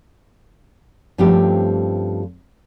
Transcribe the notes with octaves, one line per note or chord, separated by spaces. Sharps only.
G2 F3 A3 C4 C#4 G4